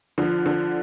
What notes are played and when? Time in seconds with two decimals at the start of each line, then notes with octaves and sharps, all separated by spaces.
0.18 D3 F3
0.46 D3